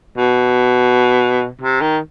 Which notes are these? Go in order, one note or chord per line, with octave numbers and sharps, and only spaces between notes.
B2
C3
D#3